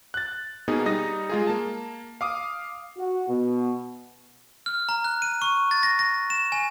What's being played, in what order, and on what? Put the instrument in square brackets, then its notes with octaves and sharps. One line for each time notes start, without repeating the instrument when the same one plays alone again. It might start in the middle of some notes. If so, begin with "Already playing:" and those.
[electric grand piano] F#6 A6
B2 A#3 B3 D#4 G#4
G3 D#4 D#6 A#6
G#3 F4 G#4
A#3 A5
F5 D6 D#6
[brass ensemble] F#4
B2
[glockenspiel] F6
A#5
F#6
D#7
C#6
A6
A#6
A#6
E7
G#5